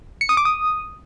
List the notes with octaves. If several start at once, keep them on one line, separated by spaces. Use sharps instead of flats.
C#7
D#6
D6
D#6